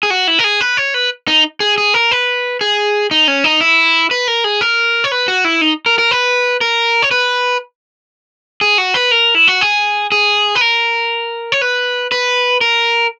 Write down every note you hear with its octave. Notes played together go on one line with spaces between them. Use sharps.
G#4
F#4
E4
A#4
G#4
B4
C#5
B4
D#4
G#4
G#4
A#4
B4
G#4
D#4
C#4
D#4
E4
B4
A#4
G#4
A#4
C#5
B4
F#4
E4
D#4
A#4
A#4
B4
A#4
C#5
B4
G#4
F#4
B4
A#4
E4
F#4
G#4
G#4
B4
A#4
C#5
B4
B4
A#4